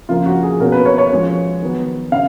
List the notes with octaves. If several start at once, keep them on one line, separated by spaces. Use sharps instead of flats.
C#3 F3 A#3 F4
F#4
G#4
B2 A#3 C#4 A#4
B4
C#5
C#5
F3 G#3 C#4
D#3 F#3 B3
C#3 F5